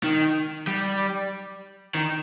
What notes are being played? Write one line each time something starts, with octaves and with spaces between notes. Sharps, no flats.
D#3
G3
D#3